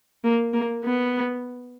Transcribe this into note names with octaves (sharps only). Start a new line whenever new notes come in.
A#3
A#3
B3